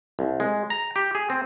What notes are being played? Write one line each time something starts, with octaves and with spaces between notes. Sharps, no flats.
C2
G#3
A#5
G4
G#4
C4